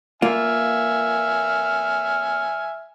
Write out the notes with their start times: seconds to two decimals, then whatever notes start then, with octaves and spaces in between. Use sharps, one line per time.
0.22 A#3 F4 E5 G#5 F6